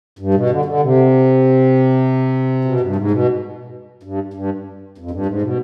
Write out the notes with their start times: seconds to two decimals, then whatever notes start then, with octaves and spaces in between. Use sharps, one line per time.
0.19 G2
0.34 B2
0.50 D3
0.65 D3
0.80 C3
2.65 B2
2.80 G2
2.96 G#2
3.11 B2
4.03 G2
4.34 G2
4.98 F2
5.11 G2
5.26 G#2
5.42 B2